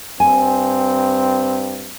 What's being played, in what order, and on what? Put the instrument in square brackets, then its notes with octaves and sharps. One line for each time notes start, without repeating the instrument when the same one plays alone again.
[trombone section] G2 C4 [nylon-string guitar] G#5